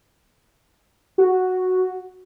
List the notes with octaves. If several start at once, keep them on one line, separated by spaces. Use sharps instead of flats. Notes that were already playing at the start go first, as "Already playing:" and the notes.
F#4